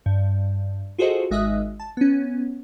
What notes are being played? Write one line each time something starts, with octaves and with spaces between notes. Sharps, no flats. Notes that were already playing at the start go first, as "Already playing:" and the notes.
G2
F4 F#4 G#4 A4 C5 D#5
G#1 G#3 D#5 E5 D#6 F#6
A5
B3 C#4